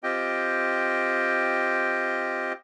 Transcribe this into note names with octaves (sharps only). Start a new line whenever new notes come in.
C4 F4 G4 D#5 G5